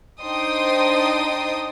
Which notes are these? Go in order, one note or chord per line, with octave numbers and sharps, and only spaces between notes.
D4 D#4 C5 G5 C6 D#6